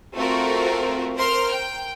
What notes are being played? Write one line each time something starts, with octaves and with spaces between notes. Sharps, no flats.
A3 C4 F4 F#4 A#4
A#4 C5 C6 F6
G5